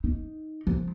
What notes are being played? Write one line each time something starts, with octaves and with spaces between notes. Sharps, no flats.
D#4
F3